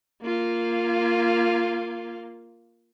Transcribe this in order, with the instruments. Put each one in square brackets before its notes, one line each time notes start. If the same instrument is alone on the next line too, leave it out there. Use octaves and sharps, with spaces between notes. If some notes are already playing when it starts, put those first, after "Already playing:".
[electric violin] A#3 F4